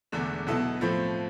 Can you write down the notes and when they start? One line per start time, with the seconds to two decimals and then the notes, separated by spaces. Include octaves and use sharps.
0.12 E1 E2 D3 A3 D4
0.47 B1 B2 B3 E4 A4
0.81 A2 F3 A3 C4